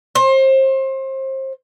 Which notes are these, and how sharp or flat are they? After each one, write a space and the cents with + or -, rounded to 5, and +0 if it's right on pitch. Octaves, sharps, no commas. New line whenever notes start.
C5 +30